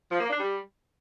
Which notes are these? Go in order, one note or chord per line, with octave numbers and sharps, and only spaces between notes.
F3
A#3
D4
G3